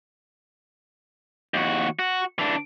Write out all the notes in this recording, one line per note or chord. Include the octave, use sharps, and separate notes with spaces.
D#2 F#4
F#4
E3 D4